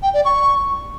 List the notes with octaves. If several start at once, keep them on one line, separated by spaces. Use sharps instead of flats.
G5
D5
C#6